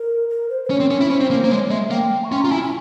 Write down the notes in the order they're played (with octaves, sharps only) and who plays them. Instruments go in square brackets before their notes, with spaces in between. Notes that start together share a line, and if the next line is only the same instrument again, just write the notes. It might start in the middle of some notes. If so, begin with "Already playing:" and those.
Already playing: [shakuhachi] A#4
A#4
C5
C5
[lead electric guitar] C#4 [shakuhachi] C#5
[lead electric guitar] C4
C#4
E4
[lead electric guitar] C#4 [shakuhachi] C5
[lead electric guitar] C4
A#3
A#3
[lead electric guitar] G#3 [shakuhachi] C#5
[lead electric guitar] G#3 [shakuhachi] E5
[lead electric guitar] A#3 [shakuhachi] G5
[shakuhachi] C#6
[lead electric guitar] C#4 [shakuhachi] C6
[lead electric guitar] F4 [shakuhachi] A#5
[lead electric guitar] E4 [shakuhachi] G#5
[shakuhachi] G#5